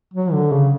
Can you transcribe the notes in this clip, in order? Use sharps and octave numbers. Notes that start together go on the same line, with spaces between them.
F#3
D3
C#3